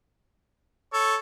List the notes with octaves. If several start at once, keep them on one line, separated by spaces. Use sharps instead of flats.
A4 C#5